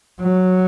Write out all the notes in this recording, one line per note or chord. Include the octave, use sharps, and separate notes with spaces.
F#3